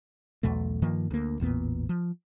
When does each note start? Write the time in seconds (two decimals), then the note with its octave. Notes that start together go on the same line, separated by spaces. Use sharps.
0.43 B1 E2 B2 A3
0.82 G2 D#3 F3 A#3
1.11 D2 A#3
1.40 A1 E2 A#2 B3
1.89 F3